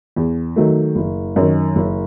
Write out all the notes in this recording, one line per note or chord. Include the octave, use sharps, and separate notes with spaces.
E2
D#3 F#3 A3
F#1
F#2 D#3
F#1